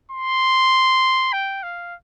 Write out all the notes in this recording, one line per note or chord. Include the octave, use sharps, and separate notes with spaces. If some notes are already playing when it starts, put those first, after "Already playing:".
C6
G5
F5